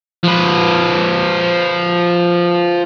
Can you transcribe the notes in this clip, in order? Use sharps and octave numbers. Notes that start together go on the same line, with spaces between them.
F3 B4